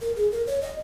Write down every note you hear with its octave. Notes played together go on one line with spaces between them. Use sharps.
A#4
G#4
A#4
C#5
D#5